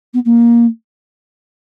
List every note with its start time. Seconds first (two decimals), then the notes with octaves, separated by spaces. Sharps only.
0.13 B3
0.25 A#3